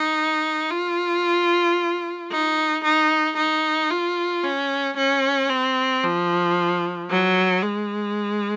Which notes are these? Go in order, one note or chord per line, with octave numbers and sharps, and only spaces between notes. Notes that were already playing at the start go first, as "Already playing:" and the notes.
Already playing: D#4
F4
D#4
D#4
D#4
F4
C#4
C#4
C4
F3
F#3
G#3